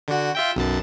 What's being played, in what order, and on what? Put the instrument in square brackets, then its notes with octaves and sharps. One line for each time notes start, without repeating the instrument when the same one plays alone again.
[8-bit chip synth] D3 F#4
F4 E5 G5
B1 F#2 A5